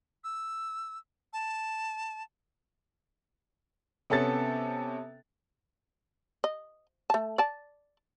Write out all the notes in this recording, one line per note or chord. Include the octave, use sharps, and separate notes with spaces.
E6
A5
C3 B3 C#4 A4 A5 A6
D#5
A3 A5
D5 A5